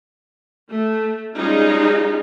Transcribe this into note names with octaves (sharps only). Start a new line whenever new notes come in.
A3
G3 G#3 C#4 D#4 F4 G#4